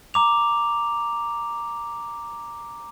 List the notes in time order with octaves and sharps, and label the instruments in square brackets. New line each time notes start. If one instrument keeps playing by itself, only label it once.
[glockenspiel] A#5 D6 F7